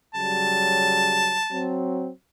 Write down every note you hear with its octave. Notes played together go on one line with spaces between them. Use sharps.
C#3 F#3 G3 A5
F#3 C4